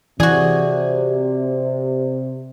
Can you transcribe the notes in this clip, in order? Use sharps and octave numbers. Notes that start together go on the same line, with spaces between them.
C3 E3 F#4 G#4 D5